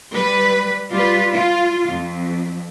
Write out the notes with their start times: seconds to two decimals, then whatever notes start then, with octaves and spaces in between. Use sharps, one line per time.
0.13 G3 B4
0.91 G3 F4 B4
1.33 F4
1.88 F2